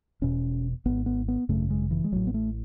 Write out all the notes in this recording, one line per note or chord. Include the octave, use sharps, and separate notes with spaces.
E1 E2 B2 C#4
G#1 G#2 B3
B3
B3
G#1 F#2 C#3 A3
G#3
E3
G#3
A1 A2 F#3
B3
A3